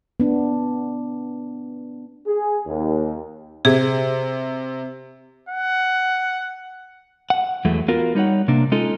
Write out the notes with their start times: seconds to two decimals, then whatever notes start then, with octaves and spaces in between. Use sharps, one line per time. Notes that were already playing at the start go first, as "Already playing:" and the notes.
0.20 B3 D4
2.26 G#4
2.67 D#2
3.65 C3 G#4
5.49 F#5
7.30 F#5
7.65 E2 F#3 G#3 A3
7.88 B3 F4 F#4 A#4
8.15 G3 D#4 C#5 F#5
8.48 C3 A#3 D4
8.72 G#3 C#4 D#4 F4 A4